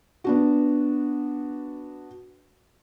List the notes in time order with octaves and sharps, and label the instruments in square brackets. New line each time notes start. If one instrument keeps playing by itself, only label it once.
[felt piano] B3 D4 F#4